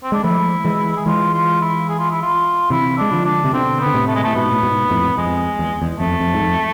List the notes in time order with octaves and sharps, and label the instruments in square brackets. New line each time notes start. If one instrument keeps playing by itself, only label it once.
[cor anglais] C4
[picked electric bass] G#3 [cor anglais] D4
[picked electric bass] F3 A3 [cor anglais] E4
[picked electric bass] E3 G#3
[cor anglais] G#4
[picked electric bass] E3 G#3 [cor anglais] F4
[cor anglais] F4
E4
G#4
F4
E4
F4
[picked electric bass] C3 E3 [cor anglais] E4
[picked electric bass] G#3 [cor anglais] D4
[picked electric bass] D3 F3
[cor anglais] D4
[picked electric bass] C3
[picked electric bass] B2 D3 [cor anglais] C4
[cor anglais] B3
[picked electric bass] D3
A2 C3
[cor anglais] A3
G#3
[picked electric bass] A2 [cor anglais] A3
[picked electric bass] G#2 B2 [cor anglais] B3
[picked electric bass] A2
G#2 B2
F2 A2
[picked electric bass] F2 [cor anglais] G#3
[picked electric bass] E2
E2
[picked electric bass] F2 [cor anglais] A3
[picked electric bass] F2
G#2
F2